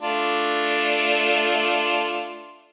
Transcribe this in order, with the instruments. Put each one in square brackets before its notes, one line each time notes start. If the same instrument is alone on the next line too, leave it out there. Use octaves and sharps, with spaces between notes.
[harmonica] A3 D4 F4